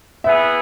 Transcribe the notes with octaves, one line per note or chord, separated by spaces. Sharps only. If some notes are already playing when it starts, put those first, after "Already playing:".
B3 E4 G#4 E5